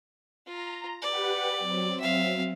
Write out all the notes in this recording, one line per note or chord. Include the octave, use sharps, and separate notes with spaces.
F4 A#5
G4 B4 D5 F#5
F#3 C4
E5 F5